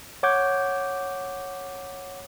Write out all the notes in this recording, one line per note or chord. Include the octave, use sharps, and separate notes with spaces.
C#5 F#5 D6 G6 G#6